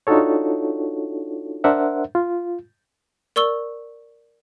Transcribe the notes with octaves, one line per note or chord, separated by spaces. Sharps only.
D4 D#4 F4 F#4 A4 C#5
D4 A#4 C5 E5 F#5
F4
A#4 D5 C#6 E6 G7